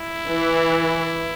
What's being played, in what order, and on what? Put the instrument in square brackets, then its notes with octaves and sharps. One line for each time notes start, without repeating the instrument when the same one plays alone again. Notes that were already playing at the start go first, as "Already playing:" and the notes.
Already playing: [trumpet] E4
[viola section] E3